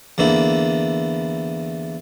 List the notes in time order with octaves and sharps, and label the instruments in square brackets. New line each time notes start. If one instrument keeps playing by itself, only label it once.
[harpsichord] E2 D3 A#3 E4